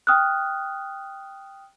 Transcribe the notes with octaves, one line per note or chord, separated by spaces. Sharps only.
G5 D#6 F6 F#6